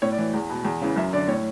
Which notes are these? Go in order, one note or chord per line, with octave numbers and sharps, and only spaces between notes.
A2 C#5
D5
E3
E2
B2
E2
C#3 E3
F#2 E5
D3 D5
A2 C#5